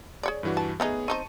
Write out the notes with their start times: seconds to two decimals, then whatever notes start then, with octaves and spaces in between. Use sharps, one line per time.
0.23 G#4 C#5 D5
0.43 G2 E3 F#4
0.57 A5
0.80 A3 B3 C#4 D#4 G#4
1.08 C4 D#4 C5 A5 C#6 D#7